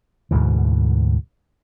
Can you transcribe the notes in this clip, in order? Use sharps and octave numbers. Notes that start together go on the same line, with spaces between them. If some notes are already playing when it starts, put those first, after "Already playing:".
D2 G#2 B2 E3